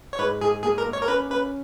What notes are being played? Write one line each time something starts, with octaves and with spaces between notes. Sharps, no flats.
C#5
G#2 B4
G#2 G#4
A#3 G#4
A#4
A#3
C#5
A#4
C#4 B4
C#4 B4